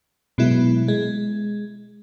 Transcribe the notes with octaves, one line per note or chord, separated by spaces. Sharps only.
B2 F#3 G#3 B3 E4
G#3